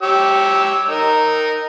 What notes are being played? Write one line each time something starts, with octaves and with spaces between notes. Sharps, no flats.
G4 C#5 E6
D#4 A#4